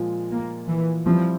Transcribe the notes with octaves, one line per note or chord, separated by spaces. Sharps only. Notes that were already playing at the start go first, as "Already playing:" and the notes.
Already playing: A#2 F3 G#3
A#3
E3
F3 G3 C4 E4